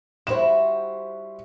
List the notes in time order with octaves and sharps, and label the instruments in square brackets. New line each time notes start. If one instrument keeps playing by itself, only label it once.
[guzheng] G3 E4 F#4 [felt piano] C5 E7